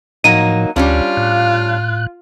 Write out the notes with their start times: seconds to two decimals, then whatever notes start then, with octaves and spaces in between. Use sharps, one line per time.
0.24 A2 F3 F#3 A#3 D#4 D#7
0.76 D2 G3 C#4 D4 F4
1.17 A2 F#6